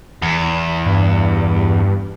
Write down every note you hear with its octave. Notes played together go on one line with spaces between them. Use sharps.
E2
G2